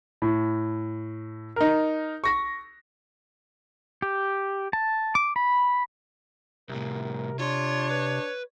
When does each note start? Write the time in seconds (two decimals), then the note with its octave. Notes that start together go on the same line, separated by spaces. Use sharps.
0.22 A2
1.56 D#4 A#4
2.24 C#6 A#6
4.02 G4
4.73 A5
5.15 D6
5.36 B5
6.69 C2 A2 C3 A#4
7.39 D4 F4 C#5 C6
7.91 B4